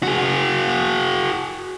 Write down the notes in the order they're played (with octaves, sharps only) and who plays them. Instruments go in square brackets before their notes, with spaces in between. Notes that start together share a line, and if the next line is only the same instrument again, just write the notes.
[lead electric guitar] F#4 G#4